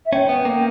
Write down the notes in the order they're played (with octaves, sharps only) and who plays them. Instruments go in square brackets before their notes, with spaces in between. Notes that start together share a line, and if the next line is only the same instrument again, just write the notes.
[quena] E5
[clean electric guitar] C#4 [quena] G5
[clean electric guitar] B3
A#3